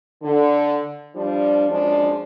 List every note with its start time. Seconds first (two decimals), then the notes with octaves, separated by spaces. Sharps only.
0.23 D3
1.15 F3 G3 D4
1.70 F#2 F3 G#3 D4